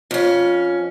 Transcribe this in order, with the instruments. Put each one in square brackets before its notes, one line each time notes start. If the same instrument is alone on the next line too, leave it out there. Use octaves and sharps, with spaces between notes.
[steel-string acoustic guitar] F2 C#4